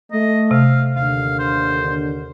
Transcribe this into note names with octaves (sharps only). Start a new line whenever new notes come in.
A3 D#5
C3 F5
D#2 D3 F5
C5